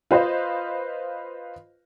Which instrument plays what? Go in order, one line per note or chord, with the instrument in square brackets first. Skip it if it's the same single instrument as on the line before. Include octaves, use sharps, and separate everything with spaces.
[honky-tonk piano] F4 B4 C5 D#5 F5